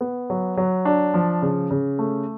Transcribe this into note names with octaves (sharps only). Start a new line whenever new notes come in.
B3
F#3
F#3
D4
F3
C#3
C#3
A3